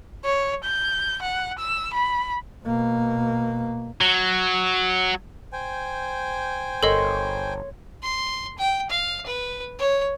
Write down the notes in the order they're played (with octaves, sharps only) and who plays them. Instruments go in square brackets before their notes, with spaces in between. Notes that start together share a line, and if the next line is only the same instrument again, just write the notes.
[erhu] C#5
G6
F#5
E6
B5
[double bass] B2 A#3
[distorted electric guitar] F#3
[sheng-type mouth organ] C5 G5 G#5
[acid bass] G1 [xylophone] A4 A#4 D#5 [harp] C#5 C6
[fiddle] C6
G5
F5
B4
C#5